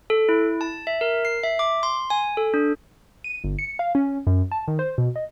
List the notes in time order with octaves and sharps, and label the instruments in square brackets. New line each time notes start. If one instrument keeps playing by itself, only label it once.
[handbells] A4
E4
A5
E5
A#4
C7
E5
D6
C6
G#5
A4
D4
[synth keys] D#7
G1
C#7
F5
C#4
F#2
A5
D#3
C5
B2
D#5